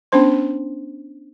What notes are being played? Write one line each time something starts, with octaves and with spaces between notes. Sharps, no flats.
B3 C#4 D4 C5 C6